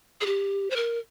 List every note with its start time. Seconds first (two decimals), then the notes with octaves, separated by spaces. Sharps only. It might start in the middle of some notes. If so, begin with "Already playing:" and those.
0.21 G#4
0.26 G4
0.70 C5
0.76 A#4